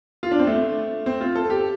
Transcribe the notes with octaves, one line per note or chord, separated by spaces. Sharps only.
F4
D4
C4
A3
C4
F4
A4
G4